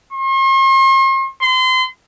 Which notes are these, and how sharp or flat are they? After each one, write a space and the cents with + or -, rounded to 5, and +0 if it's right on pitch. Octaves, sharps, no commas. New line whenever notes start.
C6 +45
C6 -30